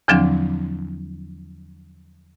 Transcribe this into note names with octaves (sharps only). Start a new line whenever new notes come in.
E2 D3 F3 F#3 C4 D4